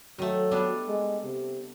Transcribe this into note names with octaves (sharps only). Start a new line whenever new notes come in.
D#3 F#3 A3
G3 B3 D4
G#3
C3